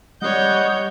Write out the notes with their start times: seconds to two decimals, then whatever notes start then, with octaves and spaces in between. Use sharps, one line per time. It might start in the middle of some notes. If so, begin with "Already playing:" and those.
0.22 G3 C#5 D#5 F#5 G6